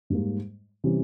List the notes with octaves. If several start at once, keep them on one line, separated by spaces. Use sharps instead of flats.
G#2 G3 A#3
C3 E3 G3 C#4